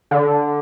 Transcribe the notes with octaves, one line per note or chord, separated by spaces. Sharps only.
D3